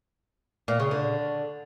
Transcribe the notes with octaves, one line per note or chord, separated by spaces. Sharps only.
A#2
C#3
D3